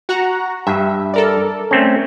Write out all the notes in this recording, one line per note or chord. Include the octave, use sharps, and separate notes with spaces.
F#4 F#5 A#5
G2 E5
A4 A#4 D5
A3 C4 C#4